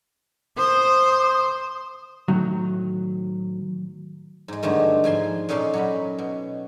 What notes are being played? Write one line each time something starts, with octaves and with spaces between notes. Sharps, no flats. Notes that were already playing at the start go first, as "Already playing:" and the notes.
C5 D#6
A2 D#3 F#3
G#2 G#3
G2 D3 D#3 G#3 A3
G#2 F3 G#5 C6
A#2 C#4 D#4 A4 D5 C6
F#3 C#4 B5
B2